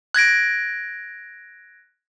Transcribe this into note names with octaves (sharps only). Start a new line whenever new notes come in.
F#6 G#6 A#6 D7